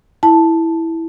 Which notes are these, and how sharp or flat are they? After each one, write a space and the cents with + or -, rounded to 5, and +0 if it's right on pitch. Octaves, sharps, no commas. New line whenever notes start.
E4 -5 A5 +0